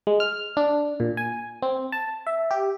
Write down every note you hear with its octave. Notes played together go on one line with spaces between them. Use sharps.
G#3
F6
D4
A#2
G#5
C4
A5
E5
G4